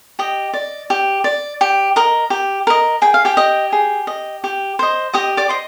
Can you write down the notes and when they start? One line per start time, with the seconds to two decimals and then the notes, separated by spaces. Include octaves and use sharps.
0.19 G4 D#5
0.54 D5
0.90 G4
1.24 D5
1.61 G4
1.96 A#4 D#5
2.30 G4
2.67 A#4 D#5
3.02 G#4 G5
3.14 F5
3.25 G4 G5
3.37 D#5
3.72 G#4
4.07 D#5
4.44 G4
4.79 C5 D#5
5.13 G4 D#5 D#6
5.37 D5 D6
5.49 C5 D#5